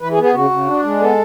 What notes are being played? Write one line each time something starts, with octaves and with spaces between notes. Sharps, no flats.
E3 B4
G#4
B3
G#4
C#3 F#4
C#3
D4
G#3
B3 A4